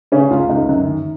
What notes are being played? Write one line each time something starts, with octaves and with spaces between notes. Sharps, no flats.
C#3 C#4
C#2 F4
C#2 D#4
F#2
D#3